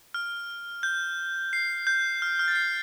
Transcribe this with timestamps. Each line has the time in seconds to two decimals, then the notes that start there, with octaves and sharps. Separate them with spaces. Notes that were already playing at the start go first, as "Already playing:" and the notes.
0.14 F6
0.83 G6
1.53 C7
1.87 G6
2.22 F6
2.39 F6
2.48 A6
2.55 C7